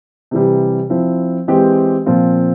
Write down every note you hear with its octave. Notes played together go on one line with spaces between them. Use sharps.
C3 E3 G3
F3 C4 E4
E3 G#3 C4 G4
A#2 F3 C4 F4